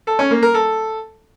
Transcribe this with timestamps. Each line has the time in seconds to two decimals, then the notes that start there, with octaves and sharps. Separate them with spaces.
0.07 A4
0.19 C#4
0.31 A#3
0.43 A#4
0.54 A4